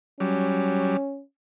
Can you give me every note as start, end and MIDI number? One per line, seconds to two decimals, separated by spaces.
0.20 0.97 54
0.20 0.97 55
0.20 1.22 61